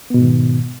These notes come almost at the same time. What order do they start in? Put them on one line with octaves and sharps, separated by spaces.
B3 B2 G#2 D#3